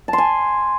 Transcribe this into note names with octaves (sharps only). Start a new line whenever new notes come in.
A5
C6
G#5